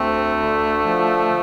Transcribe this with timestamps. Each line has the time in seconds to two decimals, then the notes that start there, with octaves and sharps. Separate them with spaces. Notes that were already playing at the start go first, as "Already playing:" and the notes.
Already playing: D2 A3 C4
0.39 D3
0.84 F3